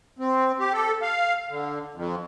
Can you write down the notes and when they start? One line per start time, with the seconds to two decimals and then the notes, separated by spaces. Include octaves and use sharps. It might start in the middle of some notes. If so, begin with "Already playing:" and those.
0.19 C4
0.59 G4
0.73 A4
1.02 F5
1.49 D3
1.94 F2